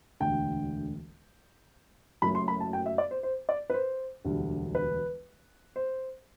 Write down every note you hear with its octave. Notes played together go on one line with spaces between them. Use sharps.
E1 D2 D3 A3 G5
F#1 F#2 F#3 A3 B5
C6
B5
A5
G5
E5
D5
C5
C5
D5
B4
C5
E1 D2 D3 G3
B4
C5